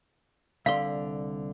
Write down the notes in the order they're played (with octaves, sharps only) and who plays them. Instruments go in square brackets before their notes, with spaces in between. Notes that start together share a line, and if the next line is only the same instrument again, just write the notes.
[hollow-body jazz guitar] C2 D3 C6 [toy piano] F5